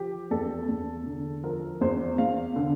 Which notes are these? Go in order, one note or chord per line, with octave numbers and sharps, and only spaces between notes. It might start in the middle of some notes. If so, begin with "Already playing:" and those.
Already playing: F3 G4
E2 A4
E2
D3
F3 A#4
E2 C5
E2 F5
D3